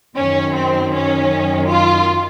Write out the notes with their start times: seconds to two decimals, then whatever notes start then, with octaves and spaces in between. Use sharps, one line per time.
0.17 F#2 D#3 C#4
0.55 C4
0.94 C#4
1.70 F4